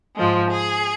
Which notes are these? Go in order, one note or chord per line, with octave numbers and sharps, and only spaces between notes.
G#2 F3 G#3
G#4